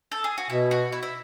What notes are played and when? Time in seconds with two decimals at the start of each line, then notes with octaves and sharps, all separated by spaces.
0.12 A4
0.24 G#4
0.38 F#4
0.50 B2 E4
0.71 F#4
0.92 E4
1.03 E4